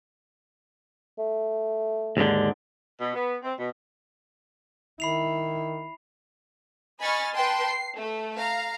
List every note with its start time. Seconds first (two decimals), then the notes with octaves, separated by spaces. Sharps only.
1.18 A3
2.17 D#2 G#2 D3
3.00 B2
3.14 B3
3.43 C4
3.58 B2
5.00 D#3 E4 B5 C7 F7
7.00 D#5 G#5 B5 C#6 F6 A6
7.35 B4 G5 A5 C6
7.65 C7
7.95 A3
8.36 F5 A#5